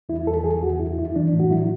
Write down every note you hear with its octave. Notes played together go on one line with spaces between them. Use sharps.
E2 E4
E2 A4
E2 G#4
E2 F#4
F#2 E4
F#2 E4
E3 D4
A2
F#4
F#3 E4